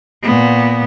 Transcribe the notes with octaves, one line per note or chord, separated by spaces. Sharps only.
A#2 B3